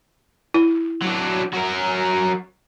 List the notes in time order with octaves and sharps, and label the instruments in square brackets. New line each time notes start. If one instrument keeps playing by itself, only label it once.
[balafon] E4
[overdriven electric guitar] F#3 D4
F#3 A#4